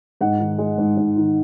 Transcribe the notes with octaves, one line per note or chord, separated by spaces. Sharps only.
G#2 F#5
D#3
G#3
G#2
G#2
D#3